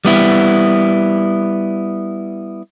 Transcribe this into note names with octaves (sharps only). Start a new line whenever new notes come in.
G3 B3 E4